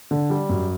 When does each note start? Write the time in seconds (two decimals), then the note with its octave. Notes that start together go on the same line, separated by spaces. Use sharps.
0.11 D3
0.30 G3
0.49 F#2